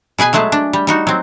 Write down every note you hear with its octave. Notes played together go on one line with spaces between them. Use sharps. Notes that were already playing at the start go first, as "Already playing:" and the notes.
B2 G#4 B4 G#5
F#3 G#3 A3 G#4 A5
D4
G3
G3 D#4 F#4
F#3 C4